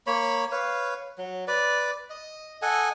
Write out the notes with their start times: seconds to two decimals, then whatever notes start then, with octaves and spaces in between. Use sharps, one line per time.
0.07 A#3 C#5 B5
0.52 B4 C#5 F5
1.18 F#3
1.48 B4 D5
2.10 D#5
2.62 A4 D#5 F#5 G#5